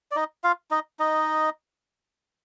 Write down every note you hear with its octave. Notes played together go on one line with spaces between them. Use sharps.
D5
D#4 D#5
F4 F5
D#4 D#5
D#4 D#5